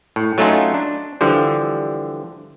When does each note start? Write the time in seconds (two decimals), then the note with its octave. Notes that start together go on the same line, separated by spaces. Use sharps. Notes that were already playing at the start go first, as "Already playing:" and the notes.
0.16 A2
0.38 F#3 A3 C#4 D#4 F4 A4
0.74 D4
1.21 D3 E3 F3 G3